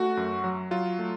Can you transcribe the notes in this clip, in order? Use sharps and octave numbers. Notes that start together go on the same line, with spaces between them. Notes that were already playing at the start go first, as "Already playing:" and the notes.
Already playing: A3 F#4
F#2
F#3
F#3 F4
A3